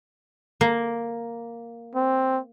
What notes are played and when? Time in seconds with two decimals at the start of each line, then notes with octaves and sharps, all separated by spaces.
0.61 A#3
1.95 C4